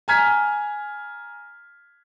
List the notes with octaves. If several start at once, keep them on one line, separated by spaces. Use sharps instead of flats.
G#5 A#5 F6 G#6 B6